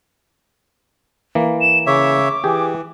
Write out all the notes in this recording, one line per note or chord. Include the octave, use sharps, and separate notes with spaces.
E3 A#3
E7
C#3 C#5 E5 D6
E3 G4 G#4